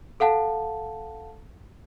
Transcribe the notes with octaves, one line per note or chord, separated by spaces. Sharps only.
A4 F5 F#5 A5